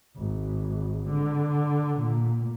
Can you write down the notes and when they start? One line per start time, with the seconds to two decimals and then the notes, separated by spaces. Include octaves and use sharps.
0.16 G#1
1.08 D3
1.99 A#2